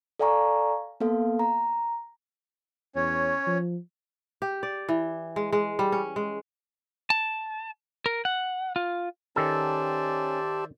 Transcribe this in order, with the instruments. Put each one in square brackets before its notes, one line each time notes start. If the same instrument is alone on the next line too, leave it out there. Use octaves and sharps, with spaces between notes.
[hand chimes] A4 D5 F5 G#5 A#5 C#6
A#3 B3 A4 F5
A#5
[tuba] E2 [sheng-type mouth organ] C#4 C#5
[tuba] F3
[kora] G4
D5
E3
G#3
G#3
G3
C#4
G#3
[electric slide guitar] A5
A#4
F#5
F4
[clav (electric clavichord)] D#3 A4 [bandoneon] C#4 [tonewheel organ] G4 A5 [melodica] C5 D5 E5